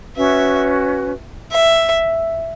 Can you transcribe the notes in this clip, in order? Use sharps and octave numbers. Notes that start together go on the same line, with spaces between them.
C#4 F#4 B4 E5
E5